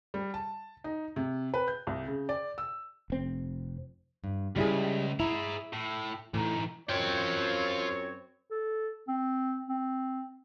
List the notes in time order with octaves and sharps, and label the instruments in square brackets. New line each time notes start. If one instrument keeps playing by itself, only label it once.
[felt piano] G3
A5
D#4
C3
B4
G6
C2
C#3
D5
E6
[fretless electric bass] F1 C4
[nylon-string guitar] G2
[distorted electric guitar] C#2 [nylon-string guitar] G3 E4 G#4
[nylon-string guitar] E4 [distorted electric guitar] G#4 A#5
[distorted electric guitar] A2
[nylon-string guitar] A2 [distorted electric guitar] E3 D#4
[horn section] F#2 C4 C#5 [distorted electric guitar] F4 G5
[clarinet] A4
C4
C4